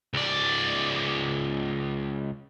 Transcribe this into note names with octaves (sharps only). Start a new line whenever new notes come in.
C#2 D5